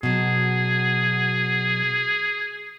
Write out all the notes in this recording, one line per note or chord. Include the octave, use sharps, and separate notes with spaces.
B2 F#3 G#4